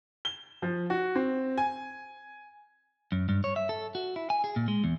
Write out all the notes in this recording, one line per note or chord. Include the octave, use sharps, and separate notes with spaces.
G7
F3
F#4
C4
G#5
F#2
G2
C#5
E5
A4
F#4
E4
G#5
G#4
A#2
G#3
E2